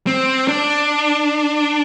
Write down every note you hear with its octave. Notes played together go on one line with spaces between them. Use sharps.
C4
D4